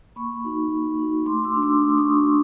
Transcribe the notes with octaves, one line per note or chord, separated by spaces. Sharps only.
A#3 B5 C#6
D#4 F#4
A#3
D#4 F#4
A3 C6 D6
D6 E6
D4 F#4
D6 E6
A3 D#6
D6
C#6 D#6
D4 F#4